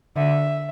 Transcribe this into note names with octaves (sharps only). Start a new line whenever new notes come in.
D3 E5